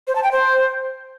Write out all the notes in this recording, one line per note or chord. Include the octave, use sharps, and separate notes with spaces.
C5
A5
G5
C5